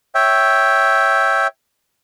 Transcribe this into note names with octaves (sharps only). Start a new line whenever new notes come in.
C#5 E5 G5